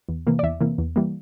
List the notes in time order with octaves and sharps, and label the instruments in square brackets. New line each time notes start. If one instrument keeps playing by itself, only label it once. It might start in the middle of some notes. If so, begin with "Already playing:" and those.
[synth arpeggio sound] E2
C3 E3 A#3
D5
E2 E5
C3 E3 A#3
E2
E3 G3 A#3